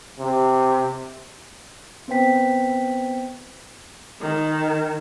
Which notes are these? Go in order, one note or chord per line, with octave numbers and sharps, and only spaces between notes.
C3
B3 C4 B4 C5 G5 B6
D#3